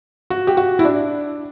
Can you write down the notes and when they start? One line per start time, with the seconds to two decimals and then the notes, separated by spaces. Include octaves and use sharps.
0.30 F#4
0.47 G4
0.57 F#4
0.79 E4
0.85 D4